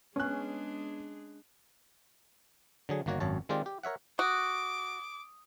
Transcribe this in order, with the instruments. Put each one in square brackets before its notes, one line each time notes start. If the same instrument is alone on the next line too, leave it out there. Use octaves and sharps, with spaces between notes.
[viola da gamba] G#3 D4 G#4 [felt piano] B3 F#6 [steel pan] C#4
[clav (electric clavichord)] D3 F#3 G#4
G1 D#3 A#3 F#4 C#5
G#1 F#2 C#5 A5
D#3 G#3 C4 F4 G4 D5
G4
A#4 C#5 E5 F#5
[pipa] F#4 [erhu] D6 [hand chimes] D#6